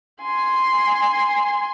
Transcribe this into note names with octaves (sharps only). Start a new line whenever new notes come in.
G#5 C6